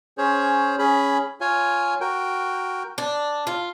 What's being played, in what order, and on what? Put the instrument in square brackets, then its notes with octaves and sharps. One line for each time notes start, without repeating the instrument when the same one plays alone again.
[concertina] C#4 G#4 C5 C#5
C#4 G#4 B5
F4 C#5 G#5
F#4 A#4 G5
[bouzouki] D4
F4